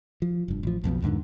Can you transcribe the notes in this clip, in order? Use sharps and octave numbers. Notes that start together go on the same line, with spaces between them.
F3
F1 G2
A1 F3
B1 F2 B2 B3
E2 G#2 D3 D#3